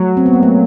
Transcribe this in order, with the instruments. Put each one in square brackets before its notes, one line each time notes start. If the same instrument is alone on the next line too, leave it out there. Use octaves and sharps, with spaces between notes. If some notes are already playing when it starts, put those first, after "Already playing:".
Already playing: [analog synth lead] F#3 [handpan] A3
[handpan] C4
B3
A#3
A3